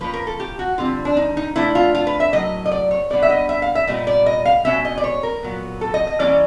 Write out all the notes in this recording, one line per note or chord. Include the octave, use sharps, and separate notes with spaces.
F3 A#3 C#4 B4
A#4
A4
G4
F#4
D3 G3 C4 F4
D4
D#4
D#4
F3 A3 D4 E4
F4
F4
B4
E5
A2 F#3 A#3 D#5
D#5
D5
C#5
B2 G3 B3 D4 D5
E5
D#5
E5
F5
E5
A#2 G3 B3 D#5
D5
D#5
F5
B2 G#3 C#4 E5
D#5
D5
C#5
A#4
A#2 F#3 B3
A4
D#5
D#5
E3 G3 A#3 C#4 D5